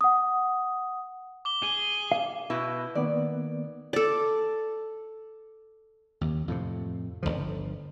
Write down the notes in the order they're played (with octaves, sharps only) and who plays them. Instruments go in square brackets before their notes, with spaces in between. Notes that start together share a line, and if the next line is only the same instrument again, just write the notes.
[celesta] F#5 D#6
[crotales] D6 G7
[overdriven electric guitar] G#4 [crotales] G7
[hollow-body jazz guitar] F5
[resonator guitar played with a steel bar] B2 E4 B4
[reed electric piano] D#3 A#3 B3 [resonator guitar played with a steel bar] D5
[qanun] A4 D5
[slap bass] D#2
F2 A2 C3
G1 D2 D3 F3